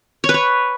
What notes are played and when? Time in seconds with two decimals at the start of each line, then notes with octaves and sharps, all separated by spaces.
0.24 C#5
0.29 B4
0.34 C#5